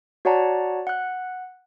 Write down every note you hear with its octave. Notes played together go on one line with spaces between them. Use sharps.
F#4 C#5 D5 F#5 A5 A#5
F#5 F#6